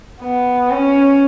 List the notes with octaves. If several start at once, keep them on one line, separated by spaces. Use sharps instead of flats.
B3
C#4